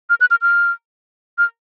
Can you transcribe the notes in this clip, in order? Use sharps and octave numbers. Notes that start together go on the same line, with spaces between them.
F6
F#6
F6
F6
F6